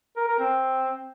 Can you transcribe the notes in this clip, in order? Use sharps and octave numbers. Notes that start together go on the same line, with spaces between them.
A#4
A#4
C4